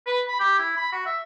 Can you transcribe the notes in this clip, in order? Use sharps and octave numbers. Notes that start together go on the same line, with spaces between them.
B4
B5
G4
E4
B5
F#4
E5